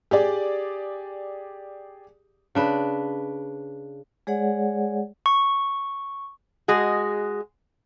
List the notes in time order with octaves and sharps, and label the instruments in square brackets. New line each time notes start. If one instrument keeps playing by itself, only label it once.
[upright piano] G4 G#4 D5
[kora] C#3 D4 B4
[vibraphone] G#3 G#4 C#5 D5 F#5
[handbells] C#6
[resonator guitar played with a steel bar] G#3 F#4 G#4